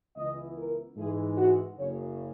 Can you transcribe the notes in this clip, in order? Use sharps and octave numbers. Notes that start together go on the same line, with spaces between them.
C#2 C#3 E3 B3 E4 D#5
A#4
G#2 E3 G#3 G#4
F#4
F#1 F#2 C#3 C#5